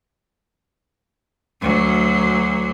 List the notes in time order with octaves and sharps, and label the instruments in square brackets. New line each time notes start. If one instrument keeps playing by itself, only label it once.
[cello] D2 F#3